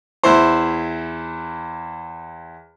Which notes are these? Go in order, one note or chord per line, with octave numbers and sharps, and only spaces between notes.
E2 E4 C5